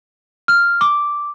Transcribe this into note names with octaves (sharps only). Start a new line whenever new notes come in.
F6
D6